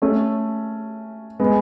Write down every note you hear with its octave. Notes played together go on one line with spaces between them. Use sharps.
A3 C#4
G#3 B3